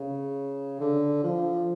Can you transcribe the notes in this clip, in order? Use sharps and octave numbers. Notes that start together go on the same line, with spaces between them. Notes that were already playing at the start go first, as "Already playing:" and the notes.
Already playing: C#3
D3
F3